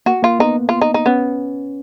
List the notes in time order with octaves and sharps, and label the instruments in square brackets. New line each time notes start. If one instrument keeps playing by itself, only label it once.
[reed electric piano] A#3 [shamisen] F#4
[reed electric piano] A#3 [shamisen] F4
[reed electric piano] B3 [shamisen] D#4
[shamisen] F4
D#4
D#4
[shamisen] B3 [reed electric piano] C#4